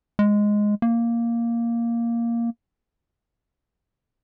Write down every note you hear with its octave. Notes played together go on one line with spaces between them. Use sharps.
G#3
A#3